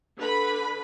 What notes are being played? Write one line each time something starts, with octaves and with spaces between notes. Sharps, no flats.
D3 B4 B5